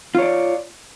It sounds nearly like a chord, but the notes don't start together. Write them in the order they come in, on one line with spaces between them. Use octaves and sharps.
F4 C#5 D5